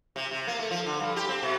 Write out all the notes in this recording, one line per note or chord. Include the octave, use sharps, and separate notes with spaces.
C3
C3
A#3
A3
F3
D3
G2
G4
C4
B2